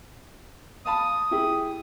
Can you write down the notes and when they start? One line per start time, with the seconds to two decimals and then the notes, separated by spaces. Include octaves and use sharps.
0.86 F5 A5 B5 D#6
1.31 E4 G4 G#4